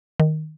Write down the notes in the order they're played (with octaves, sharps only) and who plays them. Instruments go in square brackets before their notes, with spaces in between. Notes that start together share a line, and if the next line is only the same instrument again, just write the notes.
[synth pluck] D#3